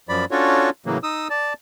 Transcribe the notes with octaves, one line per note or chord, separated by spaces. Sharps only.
F#2 F3 D5 B5
C#4 D4 F4 F#4 A4 C#5
A2 C#3 E3 F#3 A#3
D#4 D#6 E6
D5 A5